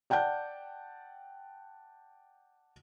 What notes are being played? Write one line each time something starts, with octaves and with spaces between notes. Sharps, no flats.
D5 F#5 G5 A5 G6